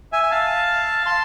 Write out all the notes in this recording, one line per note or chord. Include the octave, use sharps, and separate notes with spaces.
E5 G#5
G#5
F5 A5
A5 C6